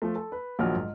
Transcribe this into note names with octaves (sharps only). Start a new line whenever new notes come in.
F3 A3
A4
B4
A#1 D#3 F3 F#3 F#5 F6
G#2